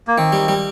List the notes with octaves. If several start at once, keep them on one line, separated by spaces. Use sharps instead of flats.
A#3
D#3 C4
G3
G3